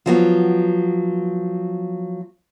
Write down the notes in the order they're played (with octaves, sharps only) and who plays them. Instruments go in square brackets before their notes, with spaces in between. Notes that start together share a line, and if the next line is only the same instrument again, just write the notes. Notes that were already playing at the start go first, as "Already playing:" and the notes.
[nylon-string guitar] F3 F#3 B3